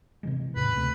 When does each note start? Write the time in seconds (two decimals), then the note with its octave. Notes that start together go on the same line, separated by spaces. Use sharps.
0.23 C3 E3 G#3
0.56 E2 A2 C#3 B4
0.74 D2 C3 A3